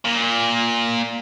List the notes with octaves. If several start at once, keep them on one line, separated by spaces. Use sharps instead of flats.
A#2